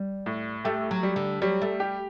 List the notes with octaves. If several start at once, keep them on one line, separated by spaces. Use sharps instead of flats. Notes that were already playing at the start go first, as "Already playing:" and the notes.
Already playing: G3
A2
A3 G4
F#3
G3
D3
F#3 G3
A3
G4